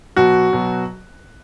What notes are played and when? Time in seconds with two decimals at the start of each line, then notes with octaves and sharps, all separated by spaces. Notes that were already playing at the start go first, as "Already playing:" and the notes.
0.16 B2 F#3 F#4
0.53 B2 F#3